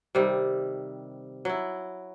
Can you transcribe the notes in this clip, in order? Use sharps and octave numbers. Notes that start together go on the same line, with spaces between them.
C3 D#3 G3
F#3 E4